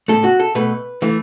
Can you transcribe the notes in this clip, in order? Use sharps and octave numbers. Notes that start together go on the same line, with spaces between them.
A2 A3 A4
F#4
A4
B2 A3 B4
E3 A3